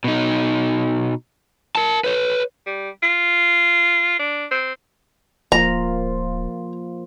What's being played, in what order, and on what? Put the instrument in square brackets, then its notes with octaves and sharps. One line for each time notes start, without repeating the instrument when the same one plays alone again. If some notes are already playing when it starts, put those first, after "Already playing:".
[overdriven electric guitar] B2 D#4
A#4 A5
B4 C#5
[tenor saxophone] G3
F4
D4
C4
[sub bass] D1 [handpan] F3 A#3 F4 [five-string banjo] A#5